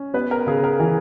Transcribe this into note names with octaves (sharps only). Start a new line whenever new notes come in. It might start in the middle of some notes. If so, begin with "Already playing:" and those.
Already playing: C#4
B3 B4
A#4
C#3 G#4
A#4
E3